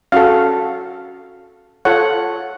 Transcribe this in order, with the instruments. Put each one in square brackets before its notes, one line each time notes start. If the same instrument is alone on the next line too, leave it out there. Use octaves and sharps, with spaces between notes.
[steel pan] C#4 F#4 A4 F5
F4 A4 C#5 F#5